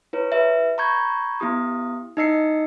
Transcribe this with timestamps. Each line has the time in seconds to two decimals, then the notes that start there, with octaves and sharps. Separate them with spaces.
0.13 E4 B4 C#5
0.32 G4 B4 E5
0.78 A#5 B5 C#6 G6 G#6
1.40 B3 E4 G4 D#6
2.17 D#4 E4 D#5 E6 C7 C#7